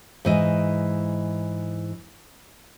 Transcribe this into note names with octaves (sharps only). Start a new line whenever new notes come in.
G#2 E3 D#5